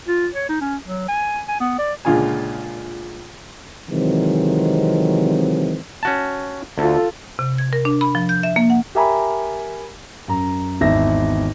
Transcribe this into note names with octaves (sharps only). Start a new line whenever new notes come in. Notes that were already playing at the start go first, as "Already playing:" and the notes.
F4
C#5
D#4
C#4
F#3
G#5
G#5
B3
D5
C#2 A#2 D3 F4 G#4 G#5
C3 D#3 E3 F#3 G#3 C4
C#4 F#4 A5
D2 F4 A4
C3
G#6
A#4
D4
B5
F3
G6
E5
A#3
F#5
G4 A#4 E5 G#5 A#5 B5
F#2 A#5
G#1 E2 E5 A#6